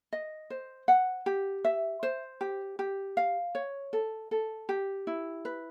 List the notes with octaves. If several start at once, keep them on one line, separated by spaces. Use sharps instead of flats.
D#5
C5
F#5
G4
E5
C5
G4
G4
F5
C#5
A4
A4
G4
E4
B4